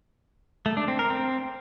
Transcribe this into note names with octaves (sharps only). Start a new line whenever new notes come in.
A3
D4
C4
A#4
C4